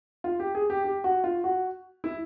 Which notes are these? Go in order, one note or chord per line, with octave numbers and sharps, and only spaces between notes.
F4
G4
G#4
G4
G4
F#4
F4
F#4
E4